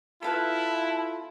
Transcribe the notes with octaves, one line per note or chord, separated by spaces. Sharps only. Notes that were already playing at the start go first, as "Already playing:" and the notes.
E4 F4 A4 B4 F5 A5 B5